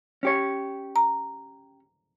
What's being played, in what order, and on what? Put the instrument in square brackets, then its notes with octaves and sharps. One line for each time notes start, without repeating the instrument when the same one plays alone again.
[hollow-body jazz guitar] C#4 G4 C#5
[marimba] A#5